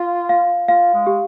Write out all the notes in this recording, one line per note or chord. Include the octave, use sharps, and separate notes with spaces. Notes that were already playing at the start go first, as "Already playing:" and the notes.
Already playing: F4 F5
F5
F4 F5
G#3
G4